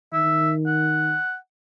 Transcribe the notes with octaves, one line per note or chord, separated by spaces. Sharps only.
D#3 E5
F#5